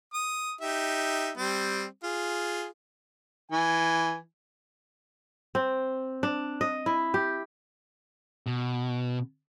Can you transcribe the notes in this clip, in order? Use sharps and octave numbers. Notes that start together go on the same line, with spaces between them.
D#6
D#4 G4 E5
G3 C4
F4 G#4
E3 G#5
C4
D4
D#5
E4
G4
B2